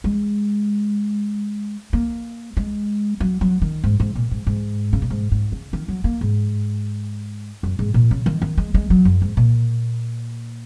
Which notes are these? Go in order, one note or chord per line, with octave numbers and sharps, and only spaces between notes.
G#3
A#3
G#3
F#3
F#3
D#3
G#2
G#2
A#2
G#2
G#2
C#3
A#2
G#2
G#2
C#3
D#3
F#3
A#3
G#2
F#2
G#2
A#2
C#3
D#3
D#3
G#3
G#3
F#3
F#2
G#2
A#2